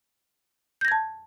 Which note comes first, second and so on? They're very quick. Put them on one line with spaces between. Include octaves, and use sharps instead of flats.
G6 A#6 G#6 A5